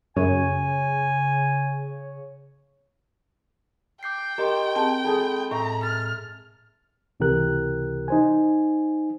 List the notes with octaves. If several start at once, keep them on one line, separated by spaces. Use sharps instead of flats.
F#2 C#3 C#5 G#5
G5 D6 G6 C7
G4 A#4 D#5 C6
C4 G#4 A5
G#3 G#4 A4 B5
A2 E5 A#5
E5 F6 A6
C#2 C3 E3 G4 A#4 F#6
D#4 C5 G#5